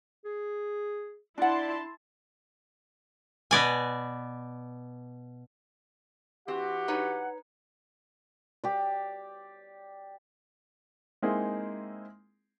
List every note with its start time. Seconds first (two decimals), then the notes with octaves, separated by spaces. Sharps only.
0.25 G#4
1.38 D4 E4 D5 F#5 A5 C6
3.51 B2 B3 D5 G#5
6.48 E3 C4 F#4 G4 F#5
6.88 D#4 B4 C#5
8.64 G4 D5
11.22 G#3 A#3 C4 D#4 E4 G#4